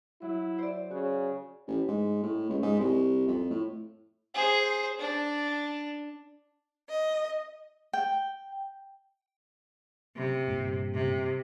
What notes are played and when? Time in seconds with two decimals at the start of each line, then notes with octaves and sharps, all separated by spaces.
0.22 F#3 E4
0.58 C5 D5
0.91 C#3 F#4
1.67 A1
1.88 G#2
2.23 A2
2.49 C#2
2.63 G#2
2.79 C2
3.28 F2
3.50 A2
4.34 G#4 C5
4.99 D4
6.89 D#5
7.93 G5
10.16 C3
10.47 G2 A#2
10.94 C3